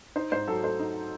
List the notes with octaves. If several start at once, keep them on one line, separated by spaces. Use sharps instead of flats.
D#4 C5
G#2 C5
F#3 A4
A3 C5
D#4